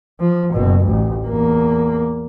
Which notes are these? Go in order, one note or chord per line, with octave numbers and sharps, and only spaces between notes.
F3
F#1 B2
A1 D2
E2 A#3